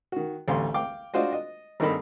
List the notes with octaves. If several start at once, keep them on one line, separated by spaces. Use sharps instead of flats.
D#3 F#4
A1 D2 G3 F5 C6
F5 G5 D6
D4 F4 F#4 C5 D#5
D#5
G#1 G2 A#3 D#4 A4 B5